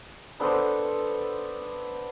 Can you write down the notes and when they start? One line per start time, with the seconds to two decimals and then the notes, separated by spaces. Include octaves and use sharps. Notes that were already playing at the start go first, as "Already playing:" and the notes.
0.40 B3 D4 A4 C5